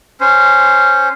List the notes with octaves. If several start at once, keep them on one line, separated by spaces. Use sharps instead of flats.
C#4 C5